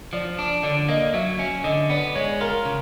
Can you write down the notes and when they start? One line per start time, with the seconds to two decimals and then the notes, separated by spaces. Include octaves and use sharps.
0.13 F3 D5
0.39 D4
0.63 D3 D5
0.89 A#3 D#5
1.14 F#3 E5
1.39 C#4
1.64 D3 D#5
1.90 B3 D5
2.15 G#3 C#5
2.41 F4 A#4
2.65 C#3